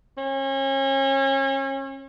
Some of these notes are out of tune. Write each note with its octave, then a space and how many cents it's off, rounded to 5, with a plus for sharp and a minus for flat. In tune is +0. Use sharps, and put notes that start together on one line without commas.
C#4 -35